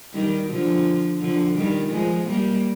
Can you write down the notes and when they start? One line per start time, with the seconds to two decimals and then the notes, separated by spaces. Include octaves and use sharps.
0.14 D#3 G3
0.49 D3 F3
1.21 D3 F3
1.56 D#3 G3
1.91 F3 G#3
2.27 G3 A#3